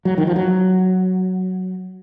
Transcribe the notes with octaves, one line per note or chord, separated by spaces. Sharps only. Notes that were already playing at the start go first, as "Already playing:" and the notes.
F#3
D#3
F3
F#3